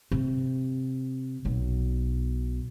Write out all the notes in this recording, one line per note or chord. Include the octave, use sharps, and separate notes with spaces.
C3
B1 B2